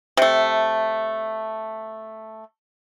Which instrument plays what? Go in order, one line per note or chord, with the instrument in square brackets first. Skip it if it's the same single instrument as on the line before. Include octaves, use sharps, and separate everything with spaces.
[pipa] C3 A3